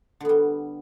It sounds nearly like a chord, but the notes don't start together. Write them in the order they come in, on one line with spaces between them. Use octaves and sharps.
D3 B3 G3